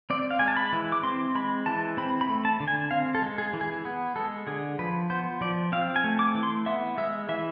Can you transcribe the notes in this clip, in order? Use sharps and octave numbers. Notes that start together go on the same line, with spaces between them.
C4 D5
F5
G#3 G#5
A5
B5
E3
D6
C4 C6
G#3 B5
E3 A5
C4 B5
B5
A3
A5
D3
G#5
C4 F5
A4
G#3
G#4
E3
G#4
B3
G#3 A4
D3 G#4
F3 B4
B3 C5
F3 D5
C4 F5
G#5
A3
D6
E3
C6
B3 E5
G#3 E5
E3 E5